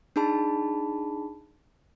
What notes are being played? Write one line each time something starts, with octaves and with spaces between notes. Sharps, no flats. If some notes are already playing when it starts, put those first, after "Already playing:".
D4 D#4 G#4 A5 B5